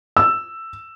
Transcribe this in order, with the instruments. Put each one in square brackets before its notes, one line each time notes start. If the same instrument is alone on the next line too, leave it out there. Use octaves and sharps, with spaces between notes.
[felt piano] E6